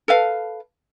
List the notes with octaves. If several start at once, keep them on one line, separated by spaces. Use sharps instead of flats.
A4 B4 F5